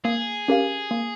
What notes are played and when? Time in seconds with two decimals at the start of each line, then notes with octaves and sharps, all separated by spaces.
0.05 A#3 G#4
0.48 C#4 G4 A#4 F5
0.91 A#3